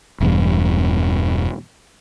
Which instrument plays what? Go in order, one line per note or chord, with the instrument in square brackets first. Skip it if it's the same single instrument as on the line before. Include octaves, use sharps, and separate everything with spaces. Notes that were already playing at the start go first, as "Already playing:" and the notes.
[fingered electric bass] E1 E2 G2